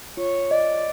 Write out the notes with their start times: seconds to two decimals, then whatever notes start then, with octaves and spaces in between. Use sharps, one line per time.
0.17 F4 C#5
0.51 D5 D#5